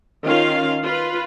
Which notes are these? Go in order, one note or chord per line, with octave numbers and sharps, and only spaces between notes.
D#3 C#4 F4 F5
F4 B4